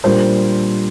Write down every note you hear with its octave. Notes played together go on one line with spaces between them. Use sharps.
A#2 G3 D4 C5